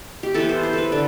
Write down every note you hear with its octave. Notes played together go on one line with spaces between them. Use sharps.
G4
E3 B3 A4
C5
C5
A4 B4
D3 A4